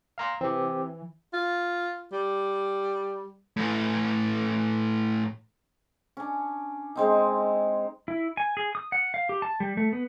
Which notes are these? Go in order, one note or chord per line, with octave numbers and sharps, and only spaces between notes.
F5 A#5 C6
E3 C4 G4
F4
G3
A2 E3
C#4 D4
G#3 C4 D#4
E4
G#5
G#4
D#6
F#5
F5
G4
A5
G3
A3
B3